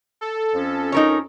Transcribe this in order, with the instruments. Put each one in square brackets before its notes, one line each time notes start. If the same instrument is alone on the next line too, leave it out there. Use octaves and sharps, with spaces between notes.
[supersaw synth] A4
[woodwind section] F2 F3 C#4
[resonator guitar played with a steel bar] D#4 A#4 C#5